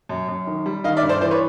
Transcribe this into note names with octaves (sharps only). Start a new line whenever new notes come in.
F#2
F#2
D#3
G3
D#3 D#5 F5
D5 E5
G2
C5 D5
E3 C5 D5
B4 C#5